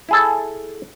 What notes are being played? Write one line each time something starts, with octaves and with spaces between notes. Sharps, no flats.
E4 G#4 A4